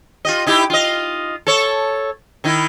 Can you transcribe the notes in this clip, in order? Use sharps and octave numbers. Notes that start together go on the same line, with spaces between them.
F4 G4 D#5
D#4 E4 G4
F4 D#5
A4 C#5
D#3 D#4 E4